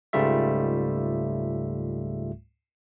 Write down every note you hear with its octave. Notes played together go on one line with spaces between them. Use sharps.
C#2 G#2 G3 A3 F4 E5